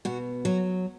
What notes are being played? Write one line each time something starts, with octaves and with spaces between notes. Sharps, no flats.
B2 F#4
F#3 F#4